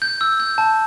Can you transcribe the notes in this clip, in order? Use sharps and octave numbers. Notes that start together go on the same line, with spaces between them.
G6
E6
G6
A5